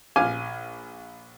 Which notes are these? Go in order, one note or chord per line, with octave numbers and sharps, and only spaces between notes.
A#1 F5 G#5 D6 F6